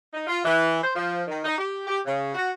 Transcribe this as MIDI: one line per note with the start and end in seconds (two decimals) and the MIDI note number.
0.14 0.23 63
0.27 0.41 65
0.44 0.80 52
0.83 0.91 72
0.95 1.22 53
1.28 1.43 51
1.45 1.58 63
1.58 1.84 67
1.87 2.00 67
2.05 2.33 49
2.35 2.50 66